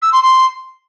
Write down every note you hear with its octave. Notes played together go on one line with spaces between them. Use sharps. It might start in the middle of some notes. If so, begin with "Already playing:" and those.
E6
C6
C6